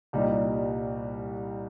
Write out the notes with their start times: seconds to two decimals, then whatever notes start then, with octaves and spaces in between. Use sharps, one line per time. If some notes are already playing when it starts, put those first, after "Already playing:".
0.13 C2 A#2 G3 D#4